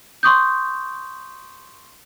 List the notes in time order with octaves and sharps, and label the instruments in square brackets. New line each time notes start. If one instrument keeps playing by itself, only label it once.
[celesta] C6 C#6 D#6 G6